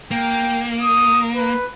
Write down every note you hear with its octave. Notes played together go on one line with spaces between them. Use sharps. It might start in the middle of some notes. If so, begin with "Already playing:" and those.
A#3 G5
D#6
B4